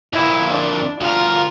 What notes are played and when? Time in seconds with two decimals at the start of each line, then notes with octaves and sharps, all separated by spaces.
0.13 F2 A#2 E4
0.51 D4
1.01 D2 F4 A#4